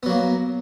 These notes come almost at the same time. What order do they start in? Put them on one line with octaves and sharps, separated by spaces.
B3 F#3 A#3